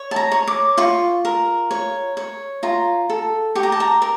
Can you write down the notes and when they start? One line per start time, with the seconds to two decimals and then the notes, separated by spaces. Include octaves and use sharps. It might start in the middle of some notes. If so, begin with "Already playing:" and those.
Already playing: C#5
0.11 A5
0.16 A#5
0.32 C#5
0.48 D6
0.77 F4 C#6
1.25 A#4
1.71 C#5
2.17 C#5
2.63 F4 A#5
3.10 A4
3.55 G4 C#6
3.63 A#5
3.72 A5
3.80 A#5
4.02 A#4